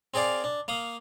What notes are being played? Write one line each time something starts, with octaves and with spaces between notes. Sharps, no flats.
C4 G#4 A#4 D5 F5
D4
A#3 F5 D#6